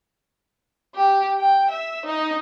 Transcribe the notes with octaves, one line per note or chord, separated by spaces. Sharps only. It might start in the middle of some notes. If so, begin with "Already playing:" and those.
G4
G5
E5
D#4